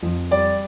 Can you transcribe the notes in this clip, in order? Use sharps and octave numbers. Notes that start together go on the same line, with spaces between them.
F2
G3 D5